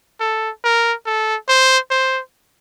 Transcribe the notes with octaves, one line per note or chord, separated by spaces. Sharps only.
A4
A#4
A4
C5
C5